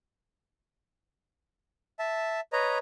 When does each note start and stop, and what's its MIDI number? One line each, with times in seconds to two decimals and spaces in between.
1.99 2.40 76
1.99 2.40 81
2.53 2.78 71
2.53 2.78 73
2.53 2.78 75
2.53 2.78 82